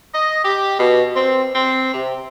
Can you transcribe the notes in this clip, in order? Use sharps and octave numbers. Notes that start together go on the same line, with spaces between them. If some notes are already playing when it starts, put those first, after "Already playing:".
D#5
G4
B2
C4
C4
C3